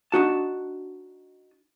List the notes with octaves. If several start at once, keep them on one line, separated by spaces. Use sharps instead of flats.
D4 D#4 F#4 A5